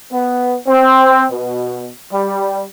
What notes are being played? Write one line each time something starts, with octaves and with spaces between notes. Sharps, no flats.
B3
C4
B2
G3